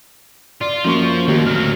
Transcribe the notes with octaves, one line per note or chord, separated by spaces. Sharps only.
F4 D5
F#2 F3 A#3 C#6
D#2 A#3 G4
D2 F#3 F6